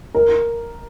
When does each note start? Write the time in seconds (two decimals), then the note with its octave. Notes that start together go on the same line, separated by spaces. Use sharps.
0.15 A#4